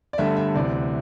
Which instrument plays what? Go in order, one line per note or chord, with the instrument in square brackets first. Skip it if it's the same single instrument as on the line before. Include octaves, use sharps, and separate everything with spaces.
[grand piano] D5
G1 G2 D3 A3 E5
E5
D2 C3 E3 D5